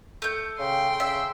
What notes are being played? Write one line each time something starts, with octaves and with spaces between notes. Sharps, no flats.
A3 G6
C#3 G5 C6
C#3 E5